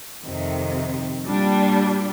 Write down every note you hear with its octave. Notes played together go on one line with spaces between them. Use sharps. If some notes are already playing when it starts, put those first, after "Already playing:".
F2 C3 D#3
A#2 G3 D4